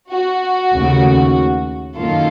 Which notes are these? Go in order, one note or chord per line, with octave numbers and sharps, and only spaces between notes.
F#4
D#2 C#3 A3
F#2 D#3 A#3 F4 A4